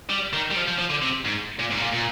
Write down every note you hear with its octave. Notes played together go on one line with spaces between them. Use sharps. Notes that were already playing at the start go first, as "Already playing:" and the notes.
G3
D#3
G3
F3
F3
F3
D3
C3
G#2
A#2
G#2
C3
A#2
A#2